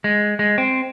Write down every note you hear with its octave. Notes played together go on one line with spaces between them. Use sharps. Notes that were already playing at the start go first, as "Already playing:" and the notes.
G#3
G#3
C4